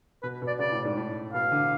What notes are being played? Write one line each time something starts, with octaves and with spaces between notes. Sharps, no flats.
B2 B4
B2
D5
C#3 D5
A2
G#2
A2
B2 F5
D3